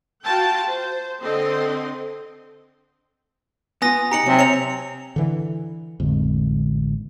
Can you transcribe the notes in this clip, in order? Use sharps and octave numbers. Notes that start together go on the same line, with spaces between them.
F4 F#4 G5 A5
C5
D3 C4 A4 D#5 C6
B3 F4 G#5 D#6 A#6
D#4 G4 A#5 C#7 F#7
C3 F#3
C#5 E5 A#5 C#7 F7
D3 E3
A1 F2 D3 G#3